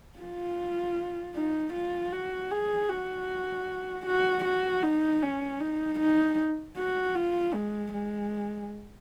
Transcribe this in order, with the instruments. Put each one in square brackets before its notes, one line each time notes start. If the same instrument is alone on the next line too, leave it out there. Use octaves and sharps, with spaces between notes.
[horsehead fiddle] F4
D#4
F4
F#4
G#4
F#4
F#4
F#4
D#4
C#4
D#4
D#4
F#4
F4
G#3
G#3